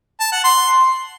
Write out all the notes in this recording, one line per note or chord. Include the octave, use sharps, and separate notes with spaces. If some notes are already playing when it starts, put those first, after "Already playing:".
A5
F#5
C6